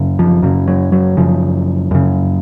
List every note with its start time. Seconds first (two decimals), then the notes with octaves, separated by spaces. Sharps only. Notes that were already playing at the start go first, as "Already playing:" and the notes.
Already playing: F#2 C#3
0.19 F3
0.42 F#2 C#3 F#3
0.68 F#3
0.92 F#3
1.17 F#2 C#3 F3
1.91 F#2 C#3